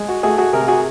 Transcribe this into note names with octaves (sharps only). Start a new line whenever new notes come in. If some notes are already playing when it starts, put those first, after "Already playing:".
Already playing: G#3
F#4
A3 F#4 G#4
F#4 G#4
C3 G#4 A#4
F#4 G#4